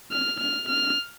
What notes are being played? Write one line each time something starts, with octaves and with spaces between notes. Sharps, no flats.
F6
F6
F6